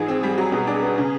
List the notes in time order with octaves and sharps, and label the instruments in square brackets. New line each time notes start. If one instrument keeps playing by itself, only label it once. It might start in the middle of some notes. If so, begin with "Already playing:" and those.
Already playing: [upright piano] G#2 E3 F3 [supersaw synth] G#4
[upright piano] C4
G3
F#3
B2
D4
B3
C#3